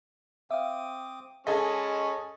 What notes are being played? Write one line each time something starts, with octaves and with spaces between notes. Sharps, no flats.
C4 E5 F5 D6 D#6
G#3 C#4 G#4 A4 D#5 B5